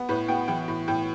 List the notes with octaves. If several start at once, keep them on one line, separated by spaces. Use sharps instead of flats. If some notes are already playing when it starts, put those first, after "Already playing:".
Already playing: B3
A2 B4
B3 G5
E3 G5
A2
A2 G5